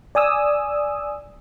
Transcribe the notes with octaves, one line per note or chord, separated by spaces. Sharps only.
D5 G#5 D#6 E6